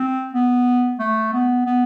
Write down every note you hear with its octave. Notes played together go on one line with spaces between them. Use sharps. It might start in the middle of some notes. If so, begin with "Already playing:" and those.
Already playing: C4
B3
A3
B3
B3